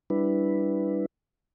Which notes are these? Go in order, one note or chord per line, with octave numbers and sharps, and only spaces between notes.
G3 D4 E4 B4